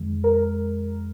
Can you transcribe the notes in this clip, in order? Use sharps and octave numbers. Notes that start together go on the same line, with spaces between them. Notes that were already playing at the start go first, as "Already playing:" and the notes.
Already playing: F2 D#3 G#3
A#4